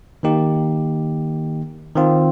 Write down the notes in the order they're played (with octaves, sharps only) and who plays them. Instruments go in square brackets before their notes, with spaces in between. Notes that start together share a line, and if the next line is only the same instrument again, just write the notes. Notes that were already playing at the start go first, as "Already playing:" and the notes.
[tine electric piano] D#3 A#3 D#4 G4
D#3 C4 F4